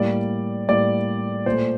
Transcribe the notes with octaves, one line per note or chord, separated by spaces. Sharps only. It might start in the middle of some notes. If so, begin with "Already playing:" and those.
Already playing: A2 G3 A#3 D5
A2 G3 A#3 D5
A#2 A3 C5